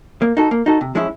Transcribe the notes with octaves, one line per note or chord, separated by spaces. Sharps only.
A#3
D#4 F#4 A4
A#3
D#4 F#4 A4
C3
F3 G#3 C#4 E4